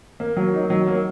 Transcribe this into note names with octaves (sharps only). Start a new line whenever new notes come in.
A#3
F#3
D#4
F#3
A#3